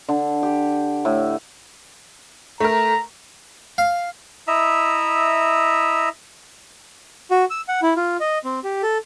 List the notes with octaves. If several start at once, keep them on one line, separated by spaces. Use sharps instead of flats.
D3
G4
A2
A3 A#4 A#5
F5
E4 D#5 E5 A#5
F#4
E6
F#5
E4
F4
D#5
C4
G4
A4